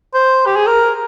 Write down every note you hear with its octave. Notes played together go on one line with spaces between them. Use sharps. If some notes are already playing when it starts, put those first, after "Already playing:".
C5
G4
G#4
A#4